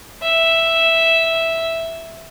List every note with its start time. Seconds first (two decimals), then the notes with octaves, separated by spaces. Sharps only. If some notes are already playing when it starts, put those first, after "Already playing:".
0.22 E5